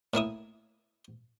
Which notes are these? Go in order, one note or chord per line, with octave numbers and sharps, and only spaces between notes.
A2 A#3 E4 D#6